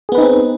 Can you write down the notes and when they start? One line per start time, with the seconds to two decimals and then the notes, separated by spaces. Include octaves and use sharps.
0.09 G#4
0.12 B3
0.15 B4
0.18 D#4
0.21 C4